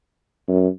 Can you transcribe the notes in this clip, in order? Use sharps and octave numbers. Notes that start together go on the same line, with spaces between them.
F#2